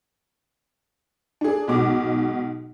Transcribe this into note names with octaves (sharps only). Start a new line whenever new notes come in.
D4 G#4
B1 G#2 B2 D6